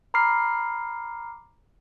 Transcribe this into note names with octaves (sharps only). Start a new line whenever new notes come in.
A#5 B5 D6 F6 C7